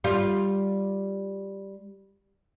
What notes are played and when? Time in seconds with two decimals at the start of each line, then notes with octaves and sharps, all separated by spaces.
0.04 G3 F4